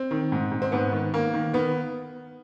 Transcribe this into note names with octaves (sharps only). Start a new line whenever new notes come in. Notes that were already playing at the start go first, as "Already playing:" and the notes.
Already playing: C4
D#3
G#2
G#2
C4
G#2 B3
D#3
D#3 A#3
D#3
D#3 B3